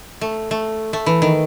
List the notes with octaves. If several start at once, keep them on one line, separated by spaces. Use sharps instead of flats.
A3
A3
A3
E3
D#3